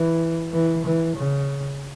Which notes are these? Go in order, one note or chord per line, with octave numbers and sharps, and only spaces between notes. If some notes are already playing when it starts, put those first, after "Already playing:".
Already playing: E3
E3
E3
C#3